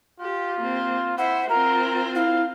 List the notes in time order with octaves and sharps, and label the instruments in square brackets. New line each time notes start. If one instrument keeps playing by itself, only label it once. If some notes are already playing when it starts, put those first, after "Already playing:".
[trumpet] F4 [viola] G4
[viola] A#3 C4
[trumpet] E4 [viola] C5 E5 [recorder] F#5
[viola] C4 F4 [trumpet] A#4 [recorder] A#5
[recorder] E4 [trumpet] F5